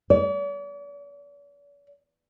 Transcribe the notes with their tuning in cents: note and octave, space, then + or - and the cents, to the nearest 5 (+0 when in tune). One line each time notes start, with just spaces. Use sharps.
D5 -45